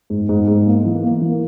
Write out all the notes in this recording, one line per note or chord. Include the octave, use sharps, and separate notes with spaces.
G#2
G#2
G#2
A#3
E3
A#3
E3